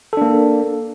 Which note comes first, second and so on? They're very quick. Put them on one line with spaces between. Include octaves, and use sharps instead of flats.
A4 D4 A#3